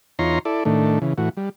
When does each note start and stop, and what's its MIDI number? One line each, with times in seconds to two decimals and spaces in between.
0.19 0.39 40
0.19 0.39 63
0.19 0.39 65
0.19 0.39 73
0.19 0.39 82
0.19 0.39 84
0.45 0.64 64
0.45 0.64 69
0.45 0.64 74
0.65 0.99 45
0.65 0.99 51
0.65 0.99 57
0.65 0.99 62
1.02 1.13 49
1.02 1.13 52
1.18 1.29 45
1.18 1.29 52
1.18 1.29 66
1.37 1.49 55